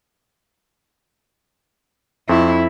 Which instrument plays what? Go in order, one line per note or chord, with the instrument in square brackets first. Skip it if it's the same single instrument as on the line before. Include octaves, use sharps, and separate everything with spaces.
[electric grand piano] F2 C6 C#6 [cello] E4